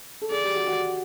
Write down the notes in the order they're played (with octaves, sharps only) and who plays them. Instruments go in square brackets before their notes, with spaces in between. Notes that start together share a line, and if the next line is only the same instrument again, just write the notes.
[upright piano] A4
[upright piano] G#4 [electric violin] D5
[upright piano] G4
F#4
F#4